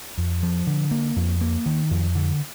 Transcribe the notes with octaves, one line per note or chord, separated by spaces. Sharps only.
F2
F3
D3
A#3
F2
A#3
D#3
F2
D3